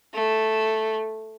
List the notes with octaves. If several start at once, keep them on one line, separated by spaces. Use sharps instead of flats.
A3